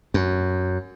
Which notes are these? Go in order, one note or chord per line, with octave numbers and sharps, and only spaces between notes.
F#2